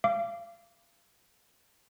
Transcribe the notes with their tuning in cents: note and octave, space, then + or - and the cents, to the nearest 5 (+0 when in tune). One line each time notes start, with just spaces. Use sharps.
F5 -35 D6 -5